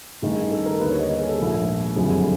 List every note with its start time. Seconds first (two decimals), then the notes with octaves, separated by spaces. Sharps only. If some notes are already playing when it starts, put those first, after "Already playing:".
0.22 A1 G2 D#3 G#4
0.51 A4
0.66 A#4
0.80 D#2 D3 G3 A#3 B4
0.90 C#5
0.99 D#5
1.09 C#5
1.19 G#4
1.29 A4
1.38 A#1 G#2 F3 A3
1.96 F#1 F2 D3 G3 G#4